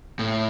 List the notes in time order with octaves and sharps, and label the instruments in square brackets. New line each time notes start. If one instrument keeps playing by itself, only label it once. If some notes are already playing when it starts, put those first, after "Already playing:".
[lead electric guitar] A2